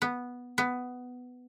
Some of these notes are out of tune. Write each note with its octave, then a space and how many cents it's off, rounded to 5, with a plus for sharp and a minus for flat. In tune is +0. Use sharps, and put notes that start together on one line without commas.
B3 -5
B3 +10